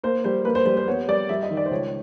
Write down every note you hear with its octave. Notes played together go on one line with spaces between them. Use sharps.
A#3 C5
G3 C5
A#3 B4
C5
G3 C5
C5
B3 C#5
G3 D5
G3 E5
D#5
D#3
D5
C5
C#2 C#5